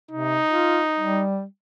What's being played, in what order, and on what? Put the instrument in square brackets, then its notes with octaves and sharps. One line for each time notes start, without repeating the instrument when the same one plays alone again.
[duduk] C3 [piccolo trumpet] D#4
[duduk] F4
G3